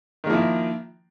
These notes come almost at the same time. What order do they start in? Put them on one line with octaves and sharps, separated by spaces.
D#3 A#3 F3 E4